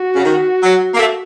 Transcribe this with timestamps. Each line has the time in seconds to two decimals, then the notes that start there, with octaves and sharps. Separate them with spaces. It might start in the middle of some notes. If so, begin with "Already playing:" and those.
Already playing: F#4
0.15 C#3
0.24 D#3
0.63 F#3
0.93 A#3
0.99 A3